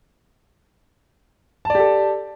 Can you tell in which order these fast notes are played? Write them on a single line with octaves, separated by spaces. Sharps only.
A5 D5 G4 A4